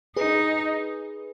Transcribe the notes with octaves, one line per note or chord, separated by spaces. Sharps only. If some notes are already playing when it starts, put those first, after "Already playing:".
D#4 G#4 B4